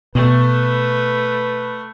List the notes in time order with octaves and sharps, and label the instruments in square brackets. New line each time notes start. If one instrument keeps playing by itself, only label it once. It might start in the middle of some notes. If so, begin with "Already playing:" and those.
[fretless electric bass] B2 [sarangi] A3 [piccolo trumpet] B4